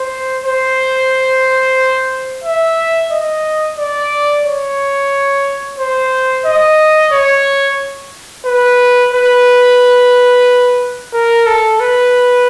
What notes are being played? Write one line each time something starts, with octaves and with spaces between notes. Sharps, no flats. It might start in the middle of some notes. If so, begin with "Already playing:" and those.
Already playing: C5
C5
E5
D#5
D5
C#5
C5
D#5
C#5
B4
B4
A#4
A4
B4